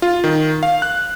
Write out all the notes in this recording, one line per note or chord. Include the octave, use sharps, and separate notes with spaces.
F4
D#3
F5
F#6